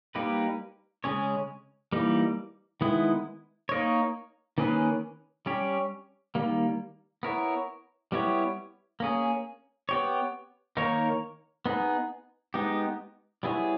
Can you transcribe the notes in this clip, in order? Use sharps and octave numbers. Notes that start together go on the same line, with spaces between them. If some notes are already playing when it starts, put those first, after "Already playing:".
G3 A#3 D#4 G4 B4
C#3 G#3 C#4 G#4 C#5
E3 G3 A#3 D#4
D#3 G#3 B3 E4
A#3 D#4 A#4 C#5
D#3 A#3 C#4 G#4 B4
G3 C#4 G4 C#5
D#3 G3 A#3
B3 E4 A#4 C#5
G3 B3 E4 G4 C#5
A#3 C#4 G#4
B3 G4 C#5
D#3 A#3 D#4 A#4 C#5
B3 D#4 G#4
G#3 B3 D#4 G4
G3 B3 E4 G#4 C#5